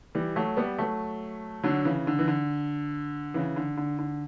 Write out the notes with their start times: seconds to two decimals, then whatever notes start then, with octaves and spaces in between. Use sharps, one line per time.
0.15 E3 G3
0.36 F#3 A3
0.57 G3 B3
0.78 F#3 A3
1.64 D3 F#3
1.85 C#3 E3
2.07 D3
2.19 E3
2.28 D3
3.34 C#3 E3
3.56 D3
3.77 D3
3.99 D3